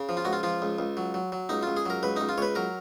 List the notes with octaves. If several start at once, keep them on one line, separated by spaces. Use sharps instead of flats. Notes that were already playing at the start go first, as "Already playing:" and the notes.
Already playing: C#3
F3
F4
C#2 F#4
F4
F3 F4
C#2
C#2
F#3
F#3
F#3
C#2 D#4
C#2 F4
G#4
F#3 A#4
C#2 B4
C#2 D#4
F4
C#2 B4 C#5
F#3 A#4